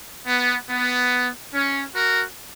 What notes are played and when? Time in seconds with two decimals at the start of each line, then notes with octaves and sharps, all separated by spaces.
0.27 B3
0.69 B3
1.53 C#4
1.94 F#4 A#4